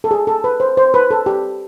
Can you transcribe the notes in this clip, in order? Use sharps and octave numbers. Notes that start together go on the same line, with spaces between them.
A4
G#4
A4
B4
C5
C5
B4
A4
G4